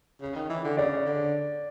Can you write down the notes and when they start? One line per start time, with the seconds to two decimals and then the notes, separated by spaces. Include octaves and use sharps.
0.21 C#3
0.35 D#3
0.49 E3
0.64 D3
0.77 C#3 D5
1.05 D3